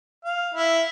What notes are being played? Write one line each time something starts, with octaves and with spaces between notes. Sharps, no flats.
F5
E4